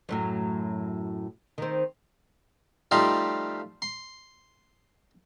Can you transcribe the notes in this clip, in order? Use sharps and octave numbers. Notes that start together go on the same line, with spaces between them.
F#2 A2 F#3
D#3 C4
F3 G3 A3 D#4 F4 G4
C6